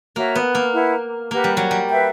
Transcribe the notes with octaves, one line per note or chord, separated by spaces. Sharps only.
A#3 F#4 C#5 E5 A#5
B3
A#3
E4 B4 F#5
A#3 G4 B4 F#5 A#5
G3
F#3
G3
B4 E5 G5